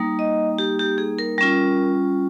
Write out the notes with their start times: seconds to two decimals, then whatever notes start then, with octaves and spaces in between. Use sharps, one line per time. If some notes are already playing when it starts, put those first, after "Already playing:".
Already playing: G3 A#3 D#4
0.19 D#5
0.58 G4
0.79 G4
0.98 G#4
1.19 A#4
1.38 G3 C#4 F4